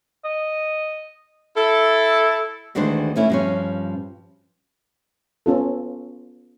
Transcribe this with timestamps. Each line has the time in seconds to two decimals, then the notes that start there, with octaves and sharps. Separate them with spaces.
0.25 D#5
1.57 E4 A4
2.75 D2 D#3 E3 G#3 D4 C5
3.16 E3 A3 C#4 E4
3.30 G2 F3 C#4
5.46 B3 C#4 F4 A4